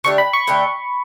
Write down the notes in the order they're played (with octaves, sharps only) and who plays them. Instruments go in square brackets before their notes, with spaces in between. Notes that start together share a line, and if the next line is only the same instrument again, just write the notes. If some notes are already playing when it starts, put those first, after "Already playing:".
[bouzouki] D3 A3 D4 G4 [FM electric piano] C#6
[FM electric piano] B5
C#6
[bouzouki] D3 A3 D4 G4